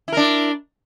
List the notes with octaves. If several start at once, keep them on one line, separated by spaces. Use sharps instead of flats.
D4 E4 A#4